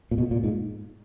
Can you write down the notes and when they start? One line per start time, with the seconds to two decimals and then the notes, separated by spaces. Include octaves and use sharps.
0.11 A#2
0.18 B2
0.31 A#2
0.44 G#2